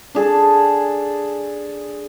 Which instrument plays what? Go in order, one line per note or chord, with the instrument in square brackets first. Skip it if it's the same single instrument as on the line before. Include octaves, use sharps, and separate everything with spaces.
[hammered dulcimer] D4 G#4 A4